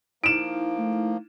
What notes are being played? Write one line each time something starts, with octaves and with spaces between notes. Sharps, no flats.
F3 A#3 D#4 E4 D7 E7
A3